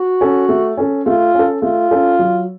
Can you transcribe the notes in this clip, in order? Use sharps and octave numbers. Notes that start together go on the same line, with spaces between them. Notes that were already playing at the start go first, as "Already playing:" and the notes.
Already playing: F#4
C#4 A4
A3
C#4 A4
A3 F4
C#4 A4
A3 F4
C#4 A4
F#3